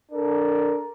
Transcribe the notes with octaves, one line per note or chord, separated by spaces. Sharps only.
D4 A4 A#4